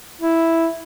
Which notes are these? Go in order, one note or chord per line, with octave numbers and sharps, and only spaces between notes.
E4